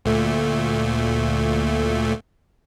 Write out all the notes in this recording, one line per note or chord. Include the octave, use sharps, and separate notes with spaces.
D2 A#2 A3